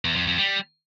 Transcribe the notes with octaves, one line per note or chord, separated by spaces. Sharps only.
E2
F2
F2
G3